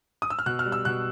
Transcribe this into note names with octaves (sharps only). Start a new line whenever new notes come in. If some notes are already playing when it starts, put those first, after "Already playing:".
D#6
E6
F6
B2 F#6
F6
G3
E6
B2 F#6